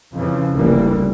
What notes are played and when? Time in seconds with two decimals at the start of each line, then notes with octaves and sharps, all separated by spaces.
0.14 F2 C#3 E3 F3
0.55 F1 C#2 E3 G3 A#3